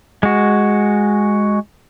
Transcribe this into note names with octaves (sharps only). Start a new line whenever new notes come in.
G#3 F#4